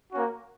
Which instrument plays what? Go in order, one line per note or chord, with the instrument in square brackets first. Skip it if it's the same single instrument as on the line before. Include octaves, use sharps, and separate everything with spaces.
[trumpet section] A#3 C#4 F#4